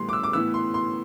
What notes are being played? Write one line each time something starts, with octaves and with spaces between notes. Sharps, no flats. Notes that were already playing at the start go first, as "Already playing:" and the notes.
Already playing: A2 E3 G3 B3 C6
D6
E6
D6
A2 E3 B3 E6
C6
C6